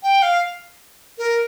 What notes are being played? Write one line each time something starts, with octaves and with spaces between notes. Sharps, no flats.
G5
F5
A#4